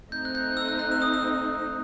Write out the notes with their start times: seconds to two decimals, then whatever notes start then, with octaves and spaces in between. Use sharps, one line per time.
0.12 A3 C4 D#4 G6
0.25 F#6
0.35 G6
0.57 E6
0.69 F#6
0.79 F#6
0.92 E6
1.02 D#6
1.14 E6